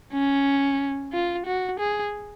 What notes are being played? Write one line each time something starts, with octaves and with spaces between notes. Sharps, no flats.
C#4
F4
F#4
G#4